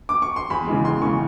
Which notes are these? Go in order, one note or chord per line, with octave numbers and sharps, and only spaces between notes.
D6
C#6
C6
E2 B5
C#3 E3 G#3
E2 C6
C#3 E3 G#3 C#6